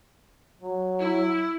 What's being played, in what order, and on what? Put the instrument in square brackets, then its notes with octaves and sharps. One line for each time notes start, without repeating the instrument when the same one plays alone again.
[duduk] F#3
[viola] E4